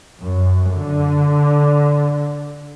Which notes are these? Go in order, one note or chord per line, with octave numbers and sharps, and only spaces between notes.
F#2
D3